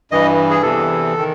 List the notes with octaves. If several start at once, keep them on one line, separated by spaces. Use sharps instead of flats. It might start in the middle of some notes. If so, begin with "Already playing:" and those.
G2 E3 D#5
G#4
E2 C3 E3 A4
D#3